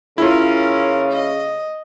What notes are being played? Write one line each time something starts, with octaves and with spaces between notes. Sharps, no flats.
C#3 C#4 E4 F4 A#4
D#5